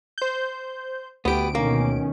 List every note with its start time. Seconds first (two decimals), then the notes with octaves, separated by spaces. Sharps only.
0.18 C5 G6
1.25 D2 B3 G4 D7
1.55 B2 D#3 A#3 C#4